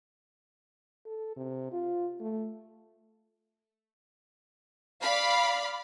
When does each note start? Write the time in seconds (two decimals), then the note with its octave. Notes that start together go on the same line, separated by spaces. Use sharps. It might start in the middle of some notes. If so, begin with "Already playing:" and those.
1.06 A4
1.37 C3
1.72 F4
2.20 A3
5.02 D5 F5 B5